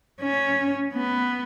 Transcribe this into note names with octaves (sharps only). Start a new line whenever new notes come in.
C#4
B3